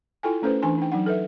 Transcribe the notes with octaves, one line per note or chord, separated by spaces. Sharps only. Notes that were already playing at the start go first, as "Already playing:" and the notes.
E4 F4 A4 G5 G#5
A3 C#4 A4 B4 C5
E3 D4 G#5 C6
D#4 G5
F#3 D#4 F#5
A4 B4 E5